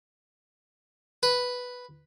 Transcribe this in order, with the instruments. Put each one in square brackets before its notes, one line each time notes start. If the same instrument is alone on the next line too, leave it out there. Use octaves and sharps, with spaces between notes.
[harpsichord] B4